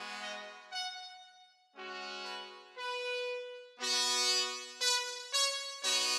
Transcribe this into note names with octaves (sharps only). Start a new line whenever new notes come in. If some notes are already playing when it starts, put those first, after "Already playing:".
Already playing: G#3 B3 F#4
D#5
F#5
G#3 C#4 F#4
B4
B4
B3 F#4
B4
C#5
B3 D#4 F#4 C#5